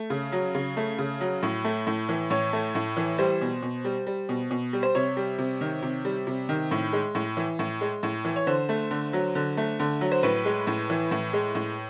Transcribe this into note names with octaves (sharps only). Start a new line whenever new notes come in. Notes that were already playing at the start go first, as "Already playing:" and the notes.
Already playing: A3
C#3
F#3
C#3
A3
C#3
F#3
A2
A3
A2
E3
A2 C#5
A3
A2
E3
G3 C5
B2
B2
G3
G3
B2
B2
G3
C5
C3 C#5
G3
C3
D#3
C3
G3
C3
D#3
A2
G#3
A2
E3
A2
G#3
A2
E3
C#5
D3 C5
A3
D3
F#3
D3
A3
D3
F#3
C5
A2 B4
G#3
A2
E3
A2
G#3
A2